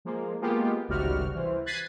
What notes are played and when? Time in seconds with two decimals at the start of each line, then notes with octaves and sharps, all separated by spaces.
0.05 F3 G#3 A#3
0.41 G#3 A#3 B3 F4 G4
0.88 G#1 C#2 C3 G3 F#4 F6
1.34 E3 C5
1.66 F#6 G#6 A6 B6 C7 D#7